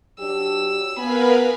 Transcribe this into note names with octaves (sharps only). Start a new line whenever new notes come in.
F#3 D4 G4 E6
B3 A#4 B4 F5 G#5 B5